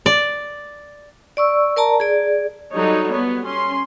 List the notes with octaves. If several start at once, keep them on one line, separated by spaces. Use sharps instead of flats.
D5
D5 C#6 E6
A#4 D5 A5 A#5
G#4 D5
F#3 G3 D#4 A4 C#5
B3 C#5
C#4 C6